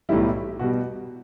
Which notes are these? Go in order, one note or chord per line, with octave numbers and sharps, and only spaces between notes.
B1 A2 E3 G3 E4
B2 G3 F#4